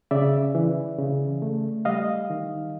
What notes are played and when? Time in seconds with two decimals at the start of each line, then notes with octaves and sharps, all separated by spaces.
0.11 C#3 D5 E5
0.55 E3
0.98 C#3
1.42 A3
1.85 G3 D#5 F5
2.30 D#3